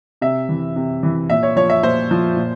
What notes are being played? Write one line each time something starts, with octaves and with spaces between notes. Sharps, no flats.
C3 E5
E3
C3
E3
A#2 E5
C#5
F3 C#5
E5
A#2 C5
F3
A#2